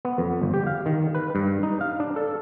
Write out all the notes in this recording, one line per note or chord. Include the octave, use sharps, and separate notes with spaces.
B3
F2
G1
G4
F5
D#3
B4
G2
D#4
F5
D4
A4